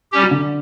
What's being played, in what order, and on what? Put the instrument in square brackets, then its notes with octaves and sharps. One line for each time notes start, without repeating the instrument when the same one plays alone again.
[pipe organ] G3 C#4 G4
[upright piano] F#3
D3